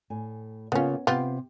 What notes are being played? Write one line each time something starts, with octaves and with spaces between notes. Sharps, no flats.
A2 G#5
C#3 A#3 B3 C#4 F4
C3 B3 F4 G4